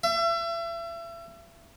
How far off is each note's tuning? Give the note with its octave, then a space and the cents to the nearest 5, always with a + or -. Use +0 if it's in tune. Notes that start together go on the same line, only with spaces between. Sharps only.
E5 +35